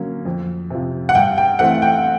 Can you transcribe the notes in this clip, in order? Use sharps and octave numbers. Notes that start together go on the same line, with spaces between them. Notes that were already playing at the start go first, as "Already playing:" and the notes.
Already playing: D3 F#3 A#3 C#4
F2
C3 F3
F#5
G2 G5
G5
E3 A3 C4 F#5
G5